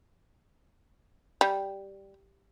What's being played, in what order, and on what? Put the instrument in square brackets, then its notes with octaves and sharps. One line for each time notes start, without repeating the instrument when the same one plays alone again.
[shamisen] G3